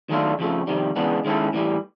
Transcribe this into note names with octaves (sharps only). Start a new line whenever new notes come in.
D#3 F#3 A3 D4 F4
F2 C#3 F3 A3
F2 C3 D#3 G3
C#3 E3 G#3 B3 D4
D#3 G#3 C#4 E4 A4
A2 E3 G3